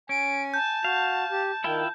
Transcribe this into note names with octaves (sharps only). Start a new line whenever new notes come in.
C#4 G#5 D7
A5 G6
F#4 F5
G4
D#3 E4 F4 G5